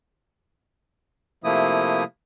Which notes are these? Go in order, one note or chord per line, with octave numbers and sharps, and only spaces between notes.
C3 F3 A3 A#3 E4 D#6